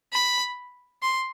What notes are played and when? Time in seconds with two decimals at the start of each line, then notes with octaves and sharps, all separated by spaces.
0.13 B5
1.02 C6